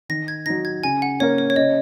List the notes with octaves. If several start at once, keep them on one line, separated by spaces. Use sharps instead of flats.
D#3 A#6
G#6
F#3 D#4 A#6
G#6
C#3 G#5
F#5
A#3 C#4 A#4 C#5
C#5
C#5
C#3 D#5